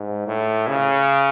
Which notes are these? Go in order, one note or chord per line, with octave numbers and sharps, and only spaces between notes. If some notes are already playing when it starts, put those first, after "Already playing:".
Already playing: G#2
A2
C#3